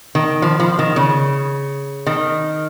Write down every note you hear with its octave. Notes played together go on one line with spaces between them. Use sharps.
D#3
F3
F3
D#3
C#3
D#3